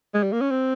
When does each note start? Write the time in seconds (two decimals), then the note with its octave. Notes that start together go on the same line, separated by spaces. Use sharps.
0.14 G#3
0.23 G3
0.32 A#3
0.41 C#4
0.51 C4